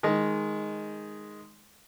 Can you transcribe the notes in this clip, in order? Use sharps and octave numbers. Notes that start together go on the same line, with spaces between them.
D#3 G#3